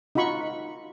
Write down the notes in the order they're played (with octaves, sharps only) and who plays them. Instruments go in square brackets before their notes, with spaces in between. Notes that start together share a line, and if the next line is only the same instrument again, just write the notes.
[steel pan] D#4 F4 F#4 B5 C#6